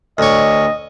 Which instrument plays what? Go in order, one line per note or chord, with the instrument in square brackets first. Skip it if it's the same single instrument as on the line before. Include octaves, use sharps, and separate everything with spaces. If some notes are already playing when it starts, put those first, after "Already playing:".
[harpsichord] D2 C#5 [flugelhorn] D#5